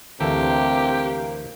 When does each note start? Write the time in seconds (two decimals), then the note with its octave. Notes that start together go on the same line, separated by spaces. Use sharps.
0.21 D2 C3 E3 A#3 G4 A4